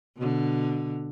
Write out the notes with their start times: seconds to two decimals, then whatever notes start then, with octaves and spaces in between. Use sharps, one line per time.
0.17 B2 D3